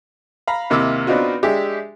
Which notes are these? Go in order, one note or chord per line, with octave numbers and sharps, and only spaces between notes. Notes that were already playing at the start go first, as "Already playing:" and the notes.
F5 A#5 B5
D#2 C3 A#3 E4 D6 E6
B3 C4 D4 D#4 F4 F#4
G#3 D4 G4 G#4 E5